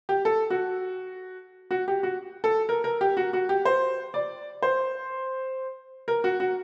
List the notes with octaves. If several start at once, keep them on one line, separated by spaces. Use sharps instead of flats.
G4
A4
F#4
F#4
G4
F#4
A4
A#4
A#4
G4
F#4
F#4
G4
C5
D5
C5
A#4
F#4
F#4